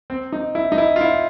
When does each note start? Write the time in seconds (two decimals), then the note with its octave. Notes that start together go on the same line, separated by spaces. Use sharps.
0.10 C4
0.32 D#4
0.55 E4
0.72 D#4
0.78 E4
0.96 F4
1.01 E4